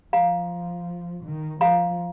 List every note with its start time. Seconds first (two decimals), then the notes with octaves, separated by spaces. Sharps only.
0.13 F3 F5 A#5
1.24 D#3
1.61 F3 F5 A#5